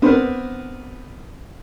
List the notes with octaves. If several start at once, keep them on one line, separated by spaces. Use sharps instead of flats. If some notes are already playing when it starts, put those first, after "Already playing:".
B3 C4 D4 A#4 B4